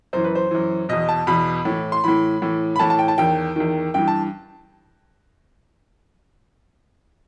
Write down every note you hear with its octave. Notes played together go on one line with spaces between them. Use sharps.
F#2 E3 C5
B4
C5
F#2 E3
E2 B2 D#5
A5
E2 B2 B5
A2 E3
C6
A2 E3 B5
A2 E3
B5
A2 E3 A5
A5
G5
A5
E2 D#3 G5
E2 D#3
G2 E3 G5
A5